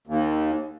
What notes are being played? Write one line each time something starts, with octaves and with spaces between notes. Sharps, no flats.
D#2